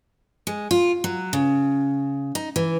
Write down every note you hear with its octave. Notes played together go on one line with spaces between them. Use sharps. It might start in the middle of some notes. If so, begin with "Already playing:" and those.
G#3
F4
F#3
C#3
D#4
E3